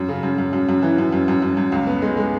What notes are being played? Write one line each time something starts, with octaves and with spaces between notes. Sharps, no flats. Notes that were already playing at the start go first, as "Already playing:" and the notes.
Already playing: F#2
C#3
F#2
F#2
F#2
F#2
E3
F#2
F#2
F#2
F#2
F#2
C#2
B3
G#3
G#3